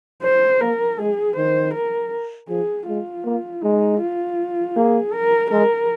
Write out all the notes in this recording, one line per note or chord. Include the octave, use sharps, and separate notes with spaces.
C5
A#3 A#4
G#3 G#4
D#3 C5
A#4
F3 G#4
G#3 F4
A#3
G#3 D#4
F4
A#3 G#4
A#4
G#3 A#4